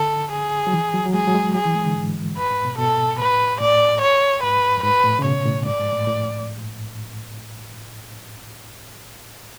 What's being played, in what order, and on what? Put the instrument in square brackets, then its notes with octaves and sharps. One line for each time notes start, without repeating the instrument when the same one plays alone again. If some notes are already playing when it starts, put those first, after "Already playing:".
Already playing: [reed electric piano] D3 [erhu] A4
[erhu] G#4
[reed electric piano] F#3
E3
F#3
F#3
[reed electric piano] G#3 [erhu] G#4
[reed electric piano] F#3
G#3
[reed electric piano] F#3 [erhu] G#4
[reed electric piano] E3
G#3
D3
G#2
[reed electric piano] F#2 [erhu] B4
[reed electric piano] G#2
B2
[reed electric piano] B2 [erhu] A4
[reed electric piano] A2 [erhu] B4
[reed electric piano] A2 [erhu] D5
[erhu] C#5
[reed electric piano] G#2 [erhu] B4
[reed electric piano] F#2
[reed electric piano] G#2 [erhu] B4
[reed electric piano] A2
C#3
[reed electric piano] B2 [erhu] C#5
[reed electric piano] A2
[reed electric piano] G#2 [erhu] D5
[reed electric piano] G#2
A2
A2